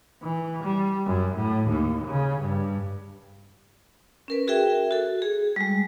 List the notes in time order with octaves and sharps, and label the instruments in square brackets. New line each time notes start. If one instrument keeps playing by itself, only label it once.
[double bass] E3
G3
F#2
A2
D#2
C#3
G2
[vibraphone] C#4 A#4 B4
F#4 G#4 A#4 E5 G5
F#4 A4
G#4
G3 G#3